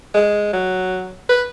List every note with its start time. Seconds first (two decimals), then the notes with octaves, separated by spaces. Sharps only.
0.15 G#3
0.53 F#3
1.30 B4